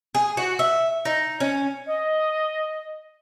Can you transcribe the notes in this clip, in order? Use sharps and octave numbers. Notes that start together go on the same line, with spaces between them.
G#4
F#4
E5
D#4
C#4
D#5